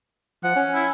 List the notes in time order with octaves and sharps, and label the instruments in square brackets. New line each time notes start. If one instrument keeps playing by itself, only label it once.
[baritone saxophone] F3 [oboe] F#5
[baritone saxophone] C#4
[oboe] E4